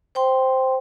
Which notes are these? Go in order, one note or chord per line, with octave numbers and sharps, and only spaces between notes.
C5 G5 C6